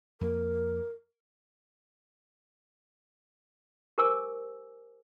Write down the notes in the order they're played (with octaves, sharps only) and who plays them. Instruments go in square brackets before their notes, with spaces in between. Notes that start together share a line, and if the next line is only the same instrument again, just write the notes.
[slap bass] F2 A#3 [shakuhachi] A#4
[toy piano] G4 A#4 C5 G#5 D6 E6